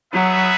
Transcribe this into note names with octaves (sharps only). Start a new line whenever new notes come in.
F#3 B3 D#4 G#4 B4 E5